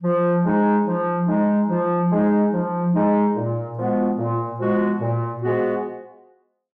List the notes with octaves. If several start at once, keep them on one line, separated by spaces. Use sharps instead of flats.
F3
G#3 D#4
F3
G#3 D#4
F3
G#3 D#4
F3
G#3 D#4
A#2
F3 G#3 B3 F#4
A#2
F3 G#3 B3 F#4
A#2
F3 G#3 B3 F#4